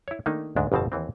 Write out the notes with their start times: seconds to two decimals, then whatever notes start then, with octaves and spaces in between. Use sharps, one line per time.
0.08 E4 C#5
0.26 D#3 A3 A#3 D4 D#4
0.56 D2 G#2 G#3 D4
0.72 G1 F2 B2 C4 A5
0.92 D#2 E3 C4